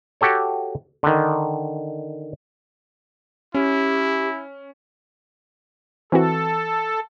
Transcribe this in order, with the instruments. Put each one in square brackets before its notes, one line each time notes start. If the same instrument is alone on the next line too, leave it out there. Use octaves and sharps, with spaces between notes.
[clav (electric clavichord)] F#4 G4 A4 C#5
D3 D#3
[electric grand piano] C#4 [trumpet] E4 [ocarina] G4
[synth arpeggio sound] E3 C4 F#4 [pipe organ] A4